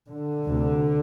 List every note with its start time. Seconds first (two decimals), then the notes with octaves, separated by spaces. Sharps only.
0.10 D3
0.46 D2 C3